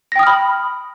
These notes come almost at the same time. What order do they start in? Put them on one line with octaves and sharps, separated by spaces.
A#6 G5 D#6 F6 B5